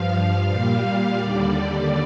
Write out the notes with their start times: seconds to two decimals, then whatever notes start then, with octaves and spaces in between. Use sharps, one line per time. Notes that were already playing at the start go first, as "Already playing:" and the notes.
Already playing: G2 F3 F5
0.49 A#2 G3 F5
1.19 D#2 D3 G3 D5